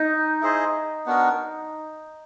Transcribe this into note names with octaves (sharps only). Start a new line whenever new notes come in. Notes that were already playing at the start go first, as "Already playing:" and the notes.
Already playing: D#4
E4 G#4 C5 D#5
B3 D4 F#4 A#4